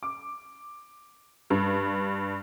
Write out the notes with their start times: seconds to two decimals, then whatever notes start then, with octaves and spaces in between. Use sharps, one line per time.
0.03 D6
1.50 G2